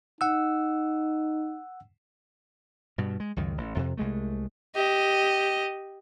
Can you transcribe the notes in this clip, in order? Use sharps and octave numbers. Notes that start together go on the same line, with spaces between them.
D#4 F#5 E6
G2 B2
G#3
C#2 F#2 D#3
A1
F2 C3
C2 G#3 A3
G4 D#5